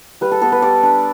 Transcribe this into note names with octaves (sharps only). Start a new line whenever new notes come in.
G3 B4
A4
B3 A4
B4
G3 D5
D4